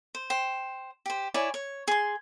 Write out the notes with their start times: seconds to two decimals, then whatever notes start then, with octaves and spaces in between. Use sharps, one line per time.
0.15 C5
0.30 C5 G5
1.06 G4 C5
1.34 E4 C#5 D5 G#5
1.54 C#5
1.88 G#4 C6